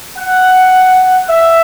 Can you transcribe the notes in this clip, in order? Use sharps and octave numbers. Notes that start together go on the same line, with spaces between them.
F#5
E5